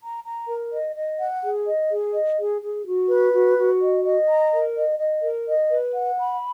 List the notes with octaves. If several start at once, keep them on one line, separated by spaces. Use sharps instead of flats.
A#5
A#5
A#4
D#5
D#5
F#5
G#4
D#5
G#4
D#5
G#4
G#4
F#4
B4
F#4
F#4
D#5
D#5
A#5
A#4
D#5
D#5
A#4
D#5
B4
F#5
B5